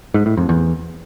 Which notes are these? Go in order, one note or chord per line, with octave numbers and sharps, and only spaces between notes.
G#2
A2
F2
E2